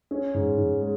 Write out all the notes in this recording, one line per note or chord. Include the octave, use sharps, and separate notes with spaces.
C#4
G#2
G#2
G#3